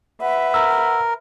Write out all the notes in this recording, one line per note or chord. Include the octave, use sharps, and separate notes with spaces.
B4 E5 F#5
A#4 E6